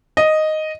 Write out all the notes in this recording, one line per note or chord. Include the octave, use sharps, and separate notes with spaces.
D#5